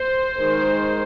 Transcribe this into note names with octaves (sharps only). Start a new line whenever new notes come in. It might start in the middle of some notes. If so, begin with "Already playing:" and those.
Already playing: C5
D#3 G#3 D#4